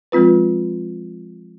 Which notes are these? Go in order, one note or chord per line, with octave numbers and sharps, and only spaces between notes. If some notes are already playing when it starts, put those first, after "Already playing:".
F3 G#3 C4 F4 B4